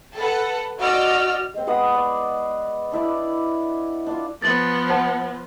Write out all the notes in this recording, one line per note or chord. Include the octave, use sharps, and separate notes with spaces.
A4 B4 F#5
F#4 D5 D#5 E6 F6
G#3 C4
G#3 B3 F#5 D#6
D5
D4 E4 D5
D4 F4
F3 B3 A6 F#7
C5 F#5 A5